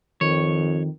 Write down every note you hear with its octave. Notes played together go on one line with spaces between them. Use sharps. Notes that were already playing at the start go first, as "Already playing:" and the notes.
F2 D#3 C#5